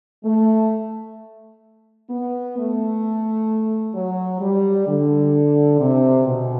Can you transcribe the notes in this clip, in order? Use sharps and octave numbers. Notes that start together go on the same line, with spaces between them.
A3
B3
A3
F#3
G3
D3
C3
B2